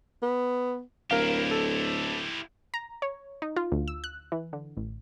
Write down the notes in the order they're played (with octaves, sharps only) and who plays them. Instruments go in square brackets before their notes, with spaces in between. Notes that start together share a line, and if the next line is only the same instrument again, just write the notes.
[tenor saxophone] B3
[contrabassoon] D1 [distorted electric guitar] E4 G4 [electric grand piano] A#4 F5
[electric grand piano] A4
[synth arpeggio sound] A#5
C#5
D#4
F4
D2
E6
F#6
E3
D3
A1